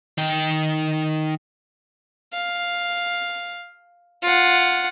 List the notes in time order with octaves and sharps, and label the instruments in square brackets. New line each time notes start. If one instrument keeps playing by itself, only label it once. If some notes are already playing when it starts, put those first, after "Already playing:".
[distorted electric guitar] D#3 G5
[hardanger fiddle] F5
F4 F#5